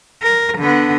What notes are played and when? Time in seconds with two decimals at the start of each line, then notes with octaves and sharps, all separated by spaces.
0.23 A#4
0.58 D3 B3